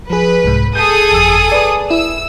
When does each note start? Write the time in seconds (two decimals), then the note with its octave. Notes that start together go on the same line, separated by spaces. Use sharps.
0.10 F3 G#4 B4
0.44 C2 G#2
0.75 G#4 A4 D#6 G6
1.12 G1 F2 E6
1.50 B4 D5 G#5
1.91 E4 E6